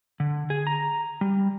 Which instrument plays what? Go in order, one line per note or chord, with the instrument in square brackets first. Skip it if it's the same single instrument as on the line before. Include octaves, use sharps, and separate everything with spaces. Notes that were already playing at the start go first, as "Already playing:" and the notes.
[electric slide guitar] D3
G#4
A#5
G3